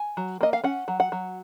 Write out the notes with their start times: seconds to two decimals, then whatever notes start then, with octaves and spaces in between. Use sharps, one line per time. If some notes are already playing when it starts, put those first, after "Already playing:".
Already playing: G#5
0.17 F#3
0.41 A#3 D#5
0.53 F5
0.64 C#4 F#5
0.88 F#3
1.00 F#5
1.12 F#3